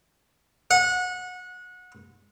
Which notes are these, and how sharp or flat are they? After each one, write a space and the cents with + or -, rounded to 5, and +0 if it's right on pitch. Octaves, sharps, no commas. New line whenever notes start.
F#5 -25